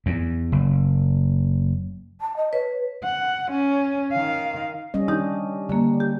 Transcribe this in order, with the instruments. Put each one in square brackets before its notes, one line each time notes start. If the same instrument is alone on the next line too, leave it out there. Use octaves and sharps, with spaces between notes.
[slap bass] E2
F#1
[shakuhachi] A5
D#5
[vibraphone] B4 [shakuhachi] C#5
[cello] F#5
C#4
D#3 F5
[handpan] G3 C#4 D#5
[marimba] D#3 D#4 G4 [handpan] D4
[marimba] D3 A#3 [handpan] G3
[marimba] G4